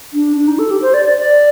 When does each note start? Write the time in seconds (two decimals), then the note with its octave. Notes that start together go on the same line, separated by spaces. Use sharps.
0.14 D4
0.37 D4
0.48 D#4
0.59 A4
0.71 G4
0.82 C5
0.94 D5
1.05 D5
1.17 D5